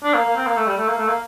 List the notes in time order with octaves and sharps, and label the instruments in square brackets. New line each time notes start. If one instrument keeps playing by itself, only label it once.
[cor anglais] D4
A#3
A#3
C4
A#3
A3
G3
A3
A#3
A3
A#3